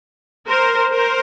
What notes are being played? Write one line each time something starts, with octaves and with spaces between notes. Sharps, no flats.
A#4 C5
A#4 C5